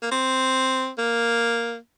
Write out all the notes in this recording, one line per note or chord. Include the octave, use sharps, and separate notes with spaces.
A#3
C4
A#3